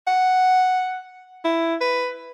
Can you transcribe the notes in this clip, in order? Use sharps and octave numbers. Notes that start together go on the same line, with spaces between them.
F#5
E4
B4